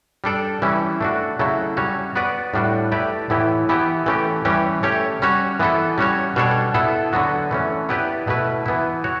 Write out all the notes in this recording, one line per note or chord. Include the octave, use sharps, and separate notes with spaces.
G3 D4 A4 D5
E3 G3 C#4 E4
A3 D4 F#4
C#3 F#3 A3 E4 A4
G3 C#4 F#4 C#5
B3 F#4 B4 D5
A2 G3 D4 F#4
A3 E4 G4 B4 D5
A2 E3 B3 E4 G4
E3 B3 E4 G4
E3 A3 C#4 G4
E3 G3 C#4 G4
A3 C#4 G4 C#5
G3 C#4 F#4 C#5
E3 B3 E4 A4
G3 C#4 F#4 C#5
B2 G3 D4 A4 C#5
B3 E4 A4
D3 F#3 B3 F#4
E3 A3 C#4
B3 E4 G4 B4 D5
B2 A3 E4 B4
E3 B3 E4
F#4 C#5